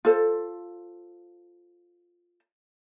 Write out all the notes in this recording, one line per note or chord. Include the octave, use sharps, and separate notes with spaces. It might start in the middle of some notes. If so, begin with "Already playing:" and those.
F4 A4 C5